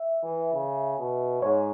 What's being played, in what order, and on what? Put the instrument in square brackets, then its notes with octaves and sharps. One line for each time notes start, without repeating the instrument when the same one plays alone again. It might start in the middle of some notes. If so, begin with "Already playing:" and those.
Already playing: [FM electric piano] E5
[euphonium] E3
C#3
B2
[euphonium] G#2 [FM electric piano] C#5